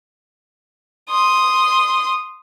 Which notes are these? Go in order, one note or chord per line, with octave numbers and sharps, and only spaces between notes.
C6 D#6